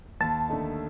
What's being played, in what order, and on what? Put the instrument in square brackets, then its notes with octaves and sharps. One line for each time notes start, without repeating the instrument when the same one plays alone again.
[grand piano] D#2 [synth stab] A5
[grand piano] D3 A3 D#4